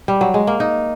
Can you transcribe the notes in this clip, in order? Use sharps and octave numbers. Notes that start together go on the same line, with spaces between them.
G3
F#3
G#3
A#3
D#4